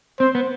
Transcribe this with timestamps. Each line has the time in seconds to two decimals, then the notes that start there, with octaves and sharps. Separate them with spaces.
0.20 C4 C5
0.35 B3